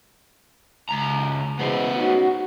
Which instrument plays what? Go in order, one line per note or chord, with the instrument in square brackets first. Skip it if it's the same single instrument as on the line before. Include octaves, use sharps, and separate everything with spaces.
[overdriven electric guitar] C#2 A#5
[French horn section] B2 E3 G#3 [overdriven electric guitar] B3 C5
[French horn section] C#4 D#4 F#4